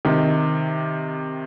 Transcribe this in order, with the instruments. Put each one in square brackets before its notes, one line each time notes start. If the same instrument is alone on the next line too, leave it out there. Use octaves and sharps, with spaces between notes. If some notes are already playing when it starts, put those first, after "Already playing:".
[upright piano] C3 D#3